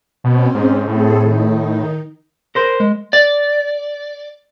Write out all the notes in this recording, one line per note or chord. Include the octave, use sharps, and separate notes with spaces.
B2 C4 C#4
G#2
A2 C4 G#4 A4
D#3 D#4
A#4 C5
G#3
D5